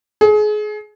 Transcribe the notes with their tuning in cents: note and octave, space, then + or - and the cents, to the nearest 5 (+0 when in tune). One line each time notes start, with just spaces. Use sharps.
G#4 +30